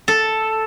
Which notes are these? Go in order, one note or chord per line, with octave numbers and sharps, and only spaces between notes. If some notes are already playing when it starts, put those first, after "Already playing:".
A4